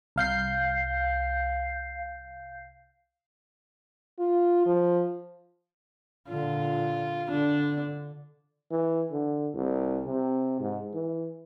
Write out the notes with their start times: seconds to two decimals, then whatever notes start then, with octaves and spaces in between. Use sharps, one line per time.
0.16 C2 F5 G6 C7
4.19 F4
4.66 F3
6.29 A#2 D3 F4
7.30 D3 D4
8.71 E3
9.11 D3
9.54 C2
10.06 C3
10.60 G#2
10.94 E3